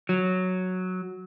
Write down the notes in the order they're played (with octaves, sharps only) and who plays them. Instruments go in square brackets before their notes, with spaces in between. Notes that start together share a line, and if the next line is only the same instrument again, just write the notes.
[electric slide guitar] F#3